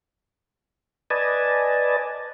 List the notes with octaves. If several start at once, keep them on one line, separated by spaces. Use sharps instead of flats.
B4 D5 D#5 G#5 A5